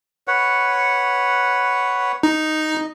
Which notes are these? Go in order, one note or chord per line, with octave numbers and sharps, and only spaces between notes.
B4 C#5 F#5
D#4 D#5